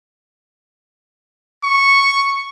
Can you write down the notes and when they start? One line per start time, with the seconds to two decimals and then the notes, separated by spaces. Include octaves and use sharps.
1.64 C#6